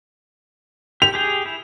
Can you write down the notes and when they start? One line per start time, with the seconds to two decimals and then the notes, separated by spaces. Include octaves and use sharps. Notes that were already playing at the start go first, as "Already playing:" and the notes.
1.02 G4 F7
1.14 G4 G#4 G5
1.46 E4